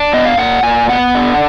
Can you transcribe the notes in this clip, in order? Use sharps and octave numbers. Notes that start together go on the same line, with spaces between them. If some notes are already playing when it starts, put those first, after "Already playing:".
Already playing: D4
B3 D#5
F5
A#2 F#5
A#2 G#5
B3 F#5
D3